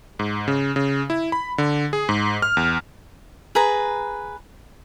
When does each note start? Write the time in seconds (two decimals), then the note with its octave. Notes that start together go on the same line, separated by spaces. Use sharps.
0.19 G#2
0.48 C#3
0.76 C#3
1.10 E4
1.32 B5
1.58 D3
1.93 G#4
2.09 G#2
2.42 F6
2.57 E2
3.55 G#4 B4 A#5